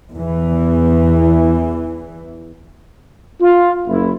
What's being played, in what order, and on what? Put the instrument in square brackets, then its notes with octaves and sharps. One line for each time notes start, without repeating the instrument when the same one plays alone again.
[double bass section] E2 E3
[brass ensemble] F4
F#1 E4